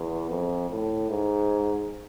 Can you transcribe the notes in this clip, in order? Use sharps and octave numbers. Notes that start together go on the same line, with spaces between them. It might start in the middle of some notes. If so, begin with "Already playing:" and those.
Already playing: E2
F2
A2
G#2